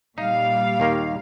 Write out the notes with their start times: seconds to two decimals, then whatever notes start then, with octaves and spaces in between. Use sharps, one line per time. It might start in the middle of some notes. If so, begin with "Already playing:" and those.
0.18 A#2 G3 D#4 F5
0.80 D#2 D#3 A#3